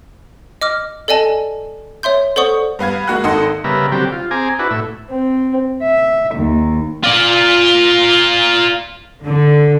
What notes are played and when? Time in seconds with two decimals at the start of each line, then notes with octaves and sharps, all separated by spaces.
0.61 D#5 D6 F6
1.08 A4 D5 D#5 G#5 A5
2.03 C#5 E5 C6 G6
2.36 A4 C5 D5 F#5 C#6 D#6
2.79 G2 B3 F5 G#6
3.08 G#3 A#3 F#4 F#5 F#6
3.24 G#1 D#3 A4 D#5 F#5 C6
3.64 C#3 G3 B3 A#4 E5
3.92 D3 F#3 G3 C4 G4
4.12 F4
4.31 C4 G#4 G#5 A#5 D6
4.59 D4 E4 F#4 B4
4.70 A2 E5
5.10 C4
5.82 E5
6.35 D#2
7.04 F4 D5
9.26 D3